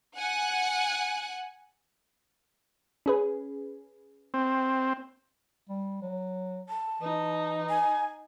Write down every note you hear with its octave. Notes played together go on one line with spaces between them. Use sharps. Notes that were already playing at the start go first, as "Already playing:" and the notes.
F#5 G#5 F#6
C#4 G#4 B4
C4
G3
F#3
A5
E3 D#4
G#5